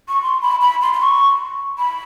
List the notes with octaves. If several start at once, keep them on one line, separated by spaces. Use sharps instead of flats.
C#6
C6
B5
B5
C6
C6
C#6
B5